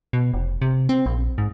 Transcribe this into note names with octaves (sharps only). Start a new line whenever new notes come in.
B2
F1
C3
C4
A#1
G#2